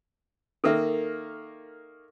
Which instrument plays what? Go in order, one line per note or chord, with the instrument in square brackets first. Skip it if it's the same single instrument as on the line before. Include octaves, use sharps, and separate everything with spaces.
[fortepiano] D#3 A#3 [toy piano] A4 A#4 E5